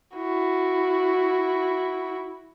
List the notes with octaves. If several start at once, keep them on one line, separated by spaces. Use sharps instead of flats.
E4 F#4